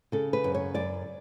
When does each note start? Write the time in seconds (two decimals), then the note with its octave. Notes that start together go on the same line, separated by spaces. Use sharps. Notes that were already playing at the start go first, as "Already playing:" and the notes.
0.12 C#3 A4
0.33 B4
0.44 F#2
0.55 C#5
0.75 F#2 D5